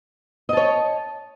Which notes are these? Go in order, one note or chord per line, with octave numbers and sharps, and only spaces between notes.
C#5 D#5 A5